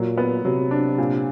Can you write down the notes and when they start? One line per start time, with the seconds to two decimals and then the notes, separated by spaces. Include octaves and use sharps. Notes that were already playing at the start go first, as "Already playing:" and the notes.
Already playing: A#2 F#3
0.18 B3
0.45 C3 F#3
0.71 D4
0.98 A#2